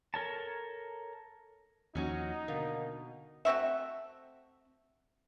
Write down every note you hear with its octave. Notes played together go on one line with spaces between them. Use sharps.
A4 A#4 C#5 A5
D#2 F3 F#3 C#4 D#4 F#4
B2 D3 A#3
A3 C4 F#4 E5